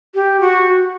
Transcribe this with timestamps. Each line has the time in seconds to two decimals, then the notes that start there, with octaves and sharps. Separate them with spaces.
0.15 G4
0.41 F#4